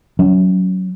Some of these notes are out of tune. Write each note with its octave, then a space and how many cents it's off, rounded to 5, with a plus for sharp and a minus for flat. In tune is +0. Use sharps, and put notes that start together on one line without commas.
F#3 +5 C#4 +20